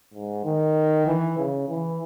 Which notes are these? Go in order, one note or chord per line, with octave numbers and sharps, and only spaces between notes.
G#2
D#3
E3
C#3
E3